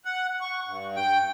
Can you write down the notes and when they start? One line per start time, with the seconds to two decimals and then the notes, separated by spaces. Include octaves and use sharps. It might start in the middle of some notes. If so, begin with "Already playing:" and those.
0.05 F#5
0.41 C#6
0.68 G2
0.96 G5